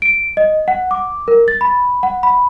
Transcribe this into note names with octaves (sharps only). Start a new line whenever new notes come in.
D7
D#5
F#5
D6
A#4
A6
B5
F#5
B5